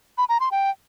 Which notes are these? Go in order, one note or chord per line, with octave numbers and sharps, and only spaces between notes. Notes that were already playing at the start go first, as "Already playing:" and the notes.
B5
A#5
C6
G5